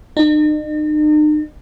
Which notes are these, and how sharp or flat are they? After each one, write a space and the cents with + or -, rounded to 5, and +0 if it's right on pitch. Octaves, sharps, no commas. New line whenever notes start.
D#4 -45